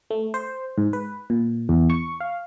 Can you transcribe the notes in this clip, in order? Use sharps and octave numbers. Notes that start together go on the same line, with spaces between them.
A3
C5
G#2
B4
A#2
E2
C#6
F5